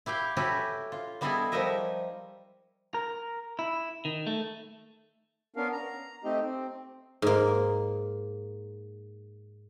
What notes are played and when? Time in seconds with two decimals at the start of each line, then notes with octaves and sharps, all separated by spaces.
0.06 E4 G4 F5 G5
0.37 C#4 E4 F#4 G4 A4 B4
0.92 F4
1.21 G3 B3 E4 G#4 A4 D#5
1.52 F3 G3 D#4 A#4 D#5 E5
2.94 A#4
3.59 E4
4.05 D#3
4.27 A3
5.56 B3 C#4 D4 A#4 F5
5.72 A#5
6.24 A3 C4 D#4 G4 D#5
6.42 C4
7.22 G#2 A#3